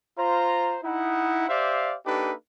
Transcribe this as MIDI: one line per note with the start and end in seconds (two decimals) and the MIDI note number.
0.19 0.78 65
0.19 0.78 72
0.19 0.78 82
0.84 1.49 63
0.84 1.49 64
0.84 1.49 78
1.49 1.96 67
1.49 1.96 72
1.49 1.96 74
1.49 1.96 76
1.49 1.96 77
2.06 2.33 58
2.06 2.33 62
2.06 2.33 63
2.06 2.33 67
2.06 2.33 69
2.06 2.33 71